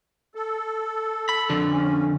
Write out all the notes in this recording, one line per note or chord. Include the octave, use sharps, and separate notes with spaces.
A4
B5
F2 D3
C#4